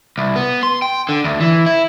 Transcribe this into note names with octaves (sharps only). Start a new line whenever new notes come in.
C2
B3
C6
G5
D3
D2
E3
E4